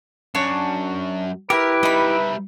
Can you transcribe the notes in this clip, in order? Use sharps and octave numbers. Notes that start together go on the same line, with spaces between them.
F#2 D4 F#4 C#5
E4 G4 A#4 B4
G3 D#4 E5 B5